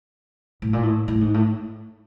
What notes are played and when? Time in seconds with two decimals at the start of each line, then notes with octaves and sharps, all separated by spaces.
0.62 A2
0.73 A#2
0.83 A2
1.08 A2
1.21 G#2
1.34 A2